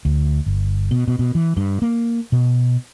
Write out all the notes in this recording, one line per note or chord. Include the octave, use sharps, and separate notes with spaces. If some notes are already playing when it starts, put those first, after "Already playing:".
D2
G1
B2
B2
B2
E3
G2
A#3
B2